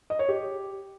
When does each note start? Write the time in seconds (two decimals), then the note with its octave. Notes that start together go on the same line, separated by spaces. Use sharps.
0.10 D#5
0.19 C#5
0.28 G4